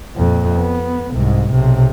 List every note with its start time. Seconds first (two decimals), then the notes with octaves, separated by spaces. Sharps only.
0.17 F2 A#2
0.57 B3
1.11 C2 G#2
1.51 B1 C3